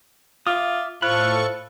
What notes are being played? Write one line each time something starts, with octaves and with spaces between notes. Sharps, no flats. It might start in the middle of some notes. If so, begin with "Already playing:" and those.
F4 E5 D6 D#6
A2 F4 A4 C5 B5 C#6 F#6